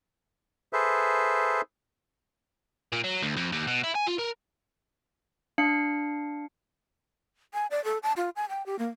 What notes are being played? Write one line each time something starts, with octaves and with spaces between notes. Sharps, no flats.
G#4 A4 B4 C5 E5
A#2
F#3
D2
F2
D#2
B2
E4
G#5
F4
A#4
D4 F5 C#7
G#5
D5
A4
A5
F4
G#5
G5
G4
A#3